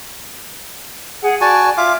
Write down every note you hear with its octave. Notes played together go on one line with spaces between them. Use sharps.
G#4 F#5
F#4 D5 G#5 A5
F4 E5 F5 D6